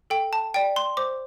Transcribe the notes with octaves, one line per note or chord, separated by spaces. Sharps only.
A4 G5
A5
D5 G5
C6
C5 D6